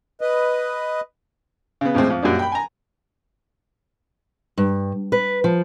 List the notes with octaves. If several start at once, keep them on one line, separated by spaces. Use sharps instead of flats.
B4 D#5
C#3 B3
F2 A2 G#3 C4
F2
F#2 A#2 G3 D4
G5 B5
G#5 A#5
G2
B4
F3